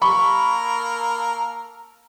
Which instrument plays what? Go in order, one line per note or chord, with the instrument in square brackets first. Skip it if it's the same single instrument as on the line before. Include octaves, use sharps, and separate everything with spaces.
[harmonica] A#3 A4 A#4 [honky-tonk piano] B5 C#6